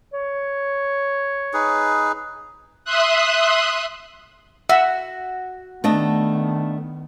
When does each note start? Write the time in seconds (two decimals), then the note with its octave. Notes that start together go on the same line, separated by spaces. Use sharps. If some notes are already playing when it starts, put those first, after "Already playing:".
0.13 C#5
1.53 D#4 G#4 B4
2.85 E5 C6 D#6 F#6
4.69 F#4 E5 F#5
5.84 D#3 A3 B3 D4 D#5